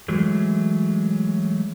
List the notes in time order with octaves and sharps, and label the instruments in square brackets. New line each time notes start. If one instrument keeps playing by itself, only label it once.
[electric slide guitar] E3 F#3 G#3 A3